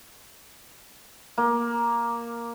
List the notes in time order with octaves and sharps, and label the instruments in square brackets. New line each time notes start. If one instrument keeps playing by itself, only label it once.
[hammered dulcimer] A#3